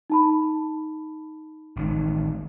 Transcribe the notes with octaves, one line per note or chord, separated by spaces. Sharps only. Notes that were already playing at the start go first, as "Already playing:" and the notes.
D#4 A5 B5
A1 D#3